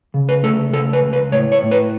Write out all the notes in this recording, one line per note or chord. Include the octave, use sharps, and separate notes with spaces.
C#3
B4
A3 A4
C#3 A4
B4
C#2
B4
A2 C#5
C#5
A2
B4